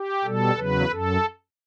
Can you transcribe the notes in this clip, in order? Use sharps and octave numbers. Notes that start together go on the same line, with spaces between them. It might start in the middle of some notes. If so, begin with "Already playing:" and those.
Already playing: G4
B2 G3 A4
E2 C#3 F#3 B4
F#2 A4